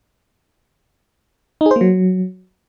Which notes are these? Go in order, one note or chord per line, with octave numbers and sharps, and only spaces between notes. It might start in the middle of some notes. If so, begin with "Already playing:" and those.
D#4
G#4
C5
A#3
F#3